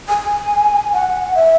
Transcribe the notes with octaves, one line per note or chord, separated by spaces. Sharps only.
G#5
F#5
E5